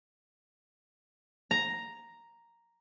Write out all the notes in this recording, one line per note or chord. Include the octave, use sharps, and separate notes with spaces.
A#5